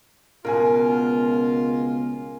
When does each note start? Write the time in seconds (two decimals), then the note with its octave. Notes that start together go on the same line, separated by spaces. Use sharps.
0.45 C#2 B2 B3 F4 A#4 G#5